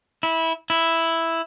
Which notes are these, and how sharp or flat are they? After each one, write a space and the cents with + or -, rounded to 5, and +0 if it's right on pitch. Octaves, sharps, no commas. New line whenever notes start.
E4 -15
E4 +0